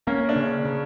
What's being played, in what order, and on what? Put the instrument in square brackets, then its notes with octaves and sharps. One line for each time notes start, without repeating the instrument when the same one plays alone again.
[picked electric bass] A#3 [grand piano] C#4
[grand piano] D4
[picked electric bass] C#3
C#3